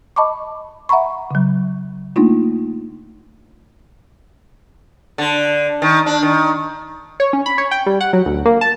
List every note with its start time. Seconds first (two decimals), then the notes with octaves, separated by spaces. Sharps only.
0.16 D#5 A5 B5 C#6 D6
0.89 E5 F#5 A#5 B5 C#6
1.31 C#3 F#3
2.16 A3 A#3 D4 D#4 F4
5.18 D3
5.82 D#3
6.06 D4
6.23 D#3
7.20 C#5
7.33 C#4
7.46 B5
7.58 C#5
7.71 G5
7.86 G3
8.01 F#5
8.13 F#3
8.26 D2
8.45 A#3
8.61 A5